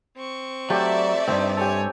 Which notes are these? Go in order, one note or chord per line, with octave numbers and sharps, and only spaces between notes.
C4 C#6
F#3 A3 G4 A4 D5 E5
C2 G2 C4 D#4
G4 A4 C#5 G#5